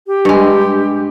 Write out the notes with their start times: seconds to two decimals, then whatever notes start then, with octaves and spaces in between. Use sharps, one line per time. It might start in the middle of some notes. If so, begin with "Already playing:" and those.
0.07 G4
0.25 G2 G#3